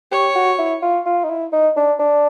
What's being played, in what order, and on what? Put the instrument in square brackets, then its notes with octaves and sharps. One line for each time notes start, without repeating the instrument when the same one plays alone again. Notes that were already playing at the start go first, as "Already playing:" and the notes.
[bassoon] G4 [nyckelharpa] C#5
[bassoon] F#4
E4
F4
F4
D#4
E4
D#4
D4
D4